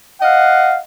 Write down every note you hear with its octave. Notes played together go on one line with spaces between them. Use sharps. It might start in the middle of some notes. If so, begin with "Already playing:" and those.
D#5 F5 F#5